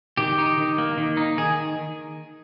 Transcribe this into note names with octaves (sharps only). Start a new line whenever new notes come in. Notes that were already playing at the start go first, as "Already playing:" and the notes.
D#3 G4
D#4
D#3
A#3
D#3
D#4
D#3 G#4